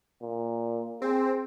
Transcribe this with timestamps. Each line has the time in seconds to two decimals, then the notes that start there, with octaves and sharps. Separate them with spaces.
0.22 A#2
1.02 C4 G#4